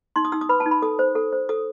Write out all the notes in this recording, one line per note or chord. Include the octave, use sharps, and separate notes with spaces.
D#4 C6
D#6
D#4 E6
D#6
B4 B5
A5
D#4
B5
A4 D#6
C5
A4
C5
A4 D#6